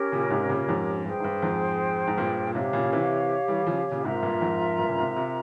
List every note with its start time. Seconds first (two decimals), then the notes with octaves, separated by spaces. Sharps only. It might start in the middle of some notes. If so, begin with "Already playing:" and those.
Already playing: C#4 G4 A#4 C#5
0.12 A#2 C#3
0.30 G#2 C3
0.49 A#2 C#3
0.68 F2 G#2
1.05 G2 G#4 C5 G5
1.20 G#2
1.24 G2
1.42 F2 G#2
2.08 G#2
2.18 G2 A#2
2.47 A#2
2.55 G#2 C3 G4 C#5 F5
2.73 A#2 C#3
2.84 C#3
2.92 C3 E3
3.48 E3 G3
3.63 E3
3.67 C#3 F3
3.91 A#2 C#3
4.04 G#2 C3 F4 A#4 E5 A#5
4.23 G2 A#2
4.41 F2 G#2
4.79 G2 A#2
4.89 C#3
4.98 G#2 C3
5.16 C3